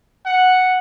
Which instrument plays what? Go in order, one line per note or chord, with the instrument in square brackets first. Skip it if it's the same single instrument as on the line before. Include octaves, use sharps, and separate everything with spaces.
[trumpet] F#5